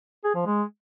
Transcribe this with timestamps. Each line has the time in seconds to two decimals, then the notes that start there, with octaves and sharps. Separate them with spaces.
0.24 G#4
0.35 F3
0.46 G#3